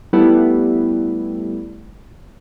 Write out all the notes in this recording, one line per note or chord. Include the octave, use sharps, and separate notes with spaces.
G3 A3 B3 E4